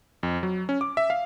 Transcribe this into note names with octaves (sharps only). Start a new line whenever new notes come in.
F2
F#3
C#4
D6
E5
F5